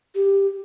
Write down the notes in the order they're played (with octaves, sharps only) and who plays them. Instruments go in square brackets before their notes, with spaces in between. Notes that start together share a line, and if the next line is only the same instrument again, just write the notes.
[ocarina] G4